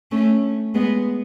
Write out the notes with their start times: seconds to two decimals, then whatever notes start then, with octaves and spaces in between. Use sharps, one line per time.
0.11 A3 C#4
0.75 G#3 B3